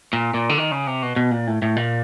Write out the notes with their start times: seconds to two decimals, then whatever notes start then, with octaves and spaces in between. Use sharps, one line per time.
0.13 A#2
0.34 A#2
0.49 D3
0.58 D#3
0.71 C#3
0.87 C3
1.02 B2
1.16 B2
1.31 A#2
1.47 A2
1.62 A2
1.76 A#2